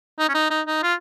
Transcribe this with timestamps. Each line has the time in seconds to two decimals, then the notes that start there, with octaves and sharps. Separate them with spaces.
0.19 D#4
0.29 C#4
0.34 D#4
0.50 D#4
0.67 D#4
0.83 F4